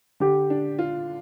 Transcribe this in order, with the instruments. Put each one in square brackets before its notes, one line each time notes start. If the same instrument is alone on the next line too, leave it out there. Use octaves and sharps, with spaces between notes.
[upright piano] D3 [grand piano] G4
[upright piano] D4
F4